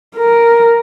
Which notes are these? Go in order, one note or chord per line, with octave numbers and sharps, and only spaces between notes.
A#4